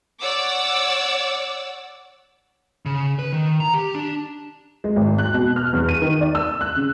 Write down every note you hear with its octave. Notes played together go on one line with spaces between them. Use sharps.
C#5 D5 F#5 D6 E6
C#3
B4
D#3
A#5
G4
D4
G#3
G#1
F#6
B2
F6
E2
D#7
D#3
D5
E6
F#6
C#3